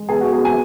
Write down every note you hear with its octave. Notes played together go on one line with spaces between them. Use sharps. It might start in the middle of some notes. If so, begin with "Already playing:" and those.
Already playing: G#3
B3 G#4
F#4
B3 G#4
G#5